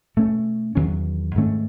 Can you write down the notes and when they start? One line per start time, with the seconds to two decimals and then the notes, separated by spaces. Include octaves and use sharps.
0.17 B2 A3 C#4
0.75 E2 D#3 F#3 C#4
1.35 G#2 D#3 A3 C#4